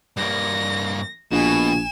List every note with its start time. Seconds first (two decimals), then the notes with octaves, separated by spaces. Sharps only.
0.17 G2 A#3 A#6
1.32 A#1 B2 G#5 E7